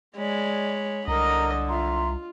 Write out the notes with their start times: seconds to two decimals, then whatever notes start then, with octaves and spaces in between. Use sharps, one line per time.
0.17 G#3 C#5 D5 B5
1.08 C2 D3 A#4 D#5 A#5
1.69 F4 E5 A#5 C6